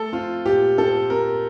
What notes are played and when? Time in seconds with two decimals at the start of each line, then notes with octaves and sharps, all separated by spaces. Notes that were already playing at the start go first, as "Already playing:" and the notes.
Already playing: A3 A4
0.12 C4 F4
0.45 A#2 G4
0.78 C4 A4
1.10 C4 A#4